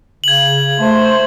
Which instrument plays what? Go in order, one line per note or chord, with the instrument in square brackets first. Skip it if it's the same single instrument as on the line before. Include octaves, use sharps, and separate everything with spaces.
[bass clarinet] C#3 [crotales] G#6 F#7
[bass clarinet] A3 [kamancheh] C5